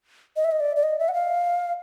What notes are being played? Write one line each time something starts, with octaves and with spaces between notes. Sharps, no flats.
D#5
E5
D#5
D5
D5
D#5
E5
F#5
F5